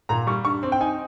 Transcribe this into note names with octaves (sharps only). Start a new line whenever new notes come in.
A#2 A#5
G3 C#6
G2 C#6
C4
G5
D#4 G#5